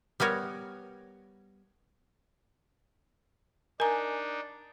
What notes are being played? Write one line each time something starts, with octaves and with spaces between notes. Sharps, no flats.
G3 B3 A#4 C#5
D4 D#4 A#4 G#5 A#5